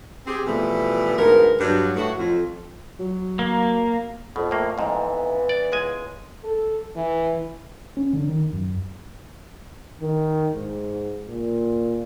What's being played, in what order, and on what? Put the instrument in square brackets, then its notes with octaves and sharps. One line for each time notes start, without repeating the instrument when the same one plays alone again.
[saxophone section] C4 G4 G#4
B2 E3 F3 G3 A3 B3
D2 G#2 B3 A#4
G2 F#3 D4
A2 F#4
F2
[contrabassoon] F#3
[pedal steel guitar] A#3
[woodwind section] F2 [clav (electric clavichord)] B2
[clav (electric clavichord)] A2 A#3
[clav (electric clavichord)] F2 G#2 [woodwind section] E3 B3
[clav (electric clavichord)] D5
C#2 G#3 G#5
[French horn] A4
E3
[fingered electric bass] C#4
D3
D#3
F#2
[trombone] D#3
G#2
A#2